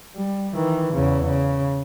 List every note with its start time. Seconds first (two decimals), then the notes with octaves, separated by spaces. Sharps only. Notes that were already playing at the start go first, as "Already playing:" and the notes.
0.16 G3
0.54 D#3 E3
0.93 E2 C#3
1.26 C#3